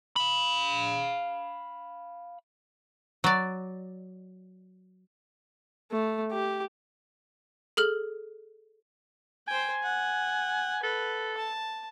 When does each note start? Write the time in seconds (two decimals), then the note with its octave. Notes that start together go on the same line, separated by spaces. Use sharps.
0.16 F5 B5
3.24 F#3 D5
5.92 A3
6.32 G4
7.77 G#4 A4 F6 F#7
9.48 C5 G5 G#5
9.83 F#5
10.83 A4 B4
11.37 A5